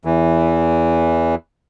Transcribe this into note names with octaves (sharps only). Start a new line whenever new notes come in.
E2 E3